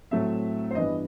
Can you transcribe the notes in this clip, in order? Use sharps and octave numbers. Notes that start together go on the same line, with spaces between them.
A2 F#3 A3 C4 E5
C5
G2 E3 B3 D#5